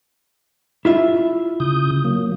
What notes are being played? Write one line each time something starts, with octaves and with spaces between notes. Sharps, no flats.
E4 F4 E5
C#3 D#6 G6
F#3 A#3